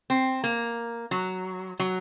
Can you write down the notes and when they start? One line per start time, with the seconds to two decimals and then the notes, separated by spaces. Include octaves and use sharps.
0.10 C4
0.44 A#3
1.11 F#3
1.80 F#3